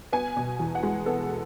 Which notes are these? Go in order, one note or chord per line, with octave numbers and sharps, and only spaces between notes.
B3 G#5
B2
E2
F#5
G#3
B3 A4